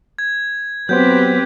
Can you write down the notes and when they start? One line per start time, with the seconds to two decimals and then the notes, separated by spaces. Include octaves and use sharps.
0.19 G#6
0.89 F#3 B3 C4 G4 B4 C5 G6